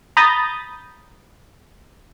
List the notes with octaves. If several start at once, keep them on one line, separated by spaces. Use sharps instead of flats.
A#5 B5 D#6 G6 A6